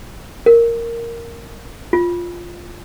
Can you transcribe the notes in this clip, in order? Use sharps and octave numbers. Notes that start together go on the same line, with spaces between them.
A#4
F4